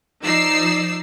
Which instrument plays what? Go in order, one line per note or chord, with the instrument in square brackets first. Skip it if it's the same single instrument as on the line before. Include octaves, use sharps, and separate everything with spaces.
[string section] F3 D#4 D5 E6 C7